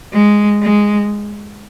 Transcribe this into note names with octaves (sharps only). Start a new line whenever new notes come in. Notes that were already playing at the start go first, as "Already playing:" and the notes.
G#3
G#3